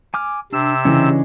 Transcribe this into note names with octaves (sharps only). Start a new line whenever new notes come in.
G#5 D6 F6
C3 D4 E6
C#3 E3 C#4 D4 D#5